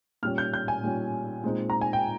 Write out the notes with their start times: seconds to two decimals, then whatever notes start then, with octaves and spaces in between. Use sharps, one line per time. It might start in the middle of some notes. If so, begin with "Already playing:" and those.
0.23 A#2 G3 C#4 F6
0.38 G6
0.54 G6
0.68 G#5
0.84 A#2 G3 C#4
1.44 A#2 G#3 C4 D#4
1.70 A#5
1.81 G#5
1.93 G5